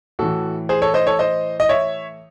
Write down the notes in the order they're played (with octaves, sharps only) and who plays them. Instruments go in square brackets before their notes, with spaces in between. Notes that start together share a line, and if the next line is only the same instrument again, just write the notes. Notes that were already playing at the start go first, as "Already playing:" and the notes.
[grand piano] A2 E3 F#4 A4
G#4 C5
A4 C#5
C5 D#5
A4 C#5
C5 D#5
D#5
C#5 E5